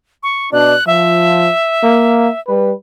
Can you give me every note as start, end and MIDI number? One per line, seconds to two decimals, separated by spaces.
0.23 0.50 85
0.53 0.75 47
0.53 0.75 62
0.53 0.87 90
0.87 1.49 53
0.87 2.40 76
1.84 2.28 58
2.48 2.73 55
2.48 2.73 71